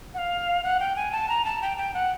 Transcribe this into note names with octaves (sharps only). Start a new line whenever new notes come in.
F#5
F5
F#5
G5
G#5
A5
A#5
A5
G5
G5
F#5